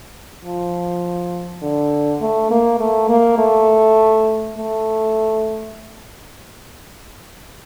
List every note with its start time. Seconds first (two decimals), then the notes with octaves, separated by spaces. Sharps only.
0.44 F3
1.62 D3
2.21 A3
2.51 A#3
2.80 A3
3.09 A#3
3.38 A3
4.57 A3